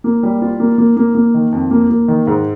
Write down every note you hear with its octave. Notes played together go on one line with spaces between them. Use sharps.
A#3
G3
F4
A#3
A#3
A#3
A#3
D#3
F2
A#3
A#3
D#3
G#2